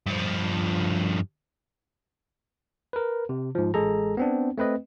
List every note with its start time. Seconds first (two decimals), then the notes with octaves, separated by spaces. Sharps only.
0.07 G2 F3
2.93 A#4 B4
3.29 C3
3.55 G#2 F3
3.74 A1 G#3 G#4 A4 A#5
4.17 B3 C4 D4
4.58 A3 C4 B4 D#5